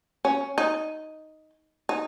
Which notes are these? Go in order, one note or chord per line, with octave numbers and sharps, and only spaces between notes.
C#4
D#4
D#4